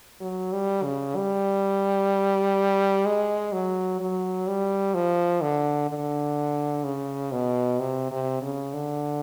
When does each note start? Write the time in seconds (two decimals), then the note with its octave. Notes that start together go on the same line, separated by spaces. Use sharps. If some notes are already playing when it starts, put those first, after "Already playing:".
0.21 F#3
0.53 G3
0.84 C#3
1.16 G3
3.06 G#3
3.52 F#3
4.00 F#3
4.47 G3
4.94 F3
5.42 D3
5.90 D3
6.84 C#3
7.32 B2
7.79 C3
8.11 C3
8.42 C#3
8.74 D3